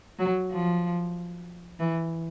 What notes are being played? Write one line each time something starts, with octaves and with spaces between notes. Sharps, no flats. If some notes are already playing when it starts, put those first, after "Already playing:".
F#3
F3
E3